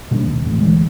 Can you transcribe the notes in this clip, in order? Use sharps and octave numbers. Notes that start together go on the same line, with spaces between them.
B2 G3 A#3 D4
D#2 C3
A#1 E2 A2 C3
D2 E3 G#3